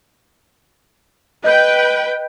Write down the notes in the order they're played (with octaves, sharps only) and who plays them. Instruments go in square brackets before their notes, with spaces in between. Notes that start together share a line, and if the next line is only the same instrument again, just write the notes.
[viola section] B4 G5 [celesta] D#5 G6